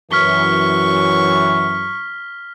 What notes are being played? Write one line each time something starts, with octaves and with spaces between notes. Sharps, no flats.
F#2 E3 C#6 F6 B6 G7